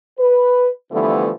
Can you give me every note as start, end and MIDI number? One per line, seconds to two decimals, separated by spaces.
0.18 0.68 71
0.92 1.30 50
0.92 1.30 52
0.92 1.30 53
0.92 1.30 55
0.92 1.30 57
0.92 1.30 59